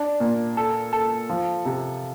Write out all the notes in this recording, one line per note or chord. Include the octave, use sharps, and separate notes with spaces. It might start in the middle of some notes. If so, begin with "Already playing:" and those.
Already playing: D4
A#2
A4
A4
F3
C3